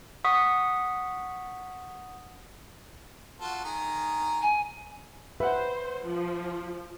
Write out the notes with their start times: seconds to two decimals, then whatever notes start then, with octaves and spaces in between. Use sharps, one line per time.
0.25 F#5 C#6 D#6 B6
3.40 F4 F#4 A4
3.64 D#3 G#4 A#5
4.42 G#5
5.40 B4 C5 E5 F#5
6.06 F3